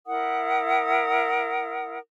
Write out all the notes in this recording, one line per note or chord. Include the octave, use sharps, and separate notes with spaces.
E4 A#4 F#5 D#6